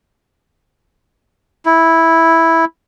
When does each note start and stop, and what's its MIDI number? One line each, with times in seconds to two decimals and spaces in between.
1.66 2.65 64